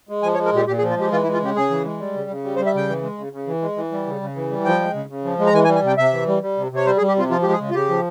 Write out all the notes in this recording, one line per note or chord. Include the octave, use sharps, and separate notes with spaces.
G#3
F3 G#5
C#5
G#3
A#4
A#2 G4
A#2 G4
G#4
F3
F4
G#3 G4
E3 F4
E4
G#3
F4
C#3 G4
C#3 G#4
E3
G#3
G3
C#3
C#3
G3
C5
G3
E5
C#3 G5
E3
G#3
C#3
C#3
E3
G#3
E3
G3
C#3
C#3
E3
G3
F3 G5
G#3
C#3
C#3
F3
G#3
A#5
E3 G#5
G#5
G3
G#5
C3 G5
C3 E5
E3
G3
G3
C3
C3 C#5
G3 C5
G#4
G3
G4
C3 F4
F3 F4
G#3 G4
G#4
C#3
F4
C#3 G4
F3